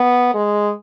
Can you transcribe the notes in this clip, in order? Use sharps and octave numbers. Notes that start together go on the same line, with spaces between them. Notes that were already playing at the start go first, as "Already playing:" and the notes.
Already playing: B3
G#3